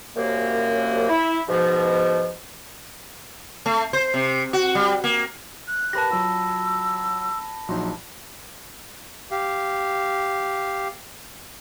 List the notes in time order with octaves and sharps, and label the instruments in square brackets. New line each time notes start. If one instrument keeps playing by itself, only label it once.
[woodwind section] C2 F#2 A#3
E4
G#2 B2 F3
[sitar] A3
C5
C3
F#4
G3
A#3
[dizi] F#6
[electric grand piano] G4 A#4 B4 [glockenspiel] A5 B5 A#6
[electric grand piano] F#3 F4 F#4 [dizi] E6
[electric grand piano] A#1 F#3 D#4 [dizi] C6
[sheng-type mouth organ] G4 F5